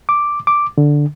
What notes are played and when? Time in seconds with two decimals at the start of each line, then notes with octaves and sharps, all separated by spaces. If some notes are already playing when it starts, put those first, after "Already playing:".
0.09 D6
0.47 D6
0.78 D3